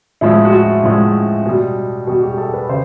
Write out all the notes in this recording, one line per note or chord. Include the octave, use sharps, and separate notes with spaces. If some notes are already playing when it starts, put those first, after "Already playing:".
A2 F3 G#3 E4
F#4
F4
A2 F3 G#3
B2 G3
B2 G3 F#4
G4
G#4
A4
B4
C#3 C5